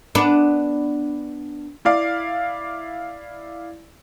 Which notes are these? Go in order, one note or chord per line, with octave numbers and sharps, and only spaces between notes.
B3 D4
E4 D5 F5